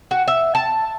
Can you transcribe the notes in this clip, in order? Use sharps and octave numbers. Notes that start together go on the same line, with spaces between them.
F#4
E5
A5